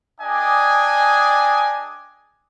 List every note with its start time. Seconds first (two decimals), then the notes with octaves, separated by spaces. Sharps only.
0.21 D4 G#4 D5 D#5 G5 G#5